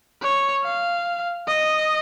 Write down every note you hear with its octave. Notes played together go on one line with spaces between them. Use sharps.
C#5
F5
D#5